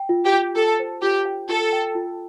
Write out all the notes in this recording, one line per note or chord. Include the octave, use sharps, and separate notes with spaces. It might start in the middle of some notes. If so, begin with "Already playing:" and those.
Already playing: G5
F4
G4
F4
F4 A4
C5
F4 G4
G5
F4 A4
G5
F4